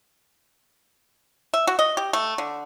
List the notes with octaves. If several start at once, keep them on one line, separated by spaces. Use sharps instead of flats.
E5
F#4
D#5
G4
A3
D3